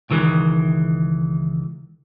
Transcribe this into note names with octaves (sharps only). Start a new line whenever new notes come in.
C#2 D#3 E3 G#3